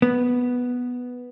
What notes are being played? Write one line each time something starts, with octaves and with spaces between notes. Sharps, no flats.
B3